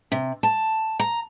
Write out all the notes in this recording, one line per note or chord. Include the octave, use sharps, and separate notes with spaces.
C3
A5
A#5